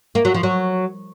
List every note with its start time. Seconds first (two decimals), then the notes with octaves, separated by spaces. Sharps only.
0.15 A#3
0.25 F#3
0.34 F3
0.43 F#3